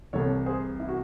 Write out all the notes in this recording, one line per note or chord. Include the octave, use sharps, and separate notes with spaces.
C2 C3 E3 A4 C#5
G#4 C5
E4
F#4